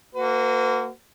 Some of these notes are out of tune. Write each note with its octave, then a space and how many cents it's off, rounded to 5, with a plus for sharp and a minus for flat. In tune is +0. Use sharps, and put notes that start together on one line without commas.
A#3 -25 F#4 +0 B4 +45